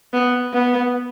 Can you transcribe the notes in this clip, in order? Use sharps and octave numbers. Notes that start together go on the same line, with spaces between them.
B3
B3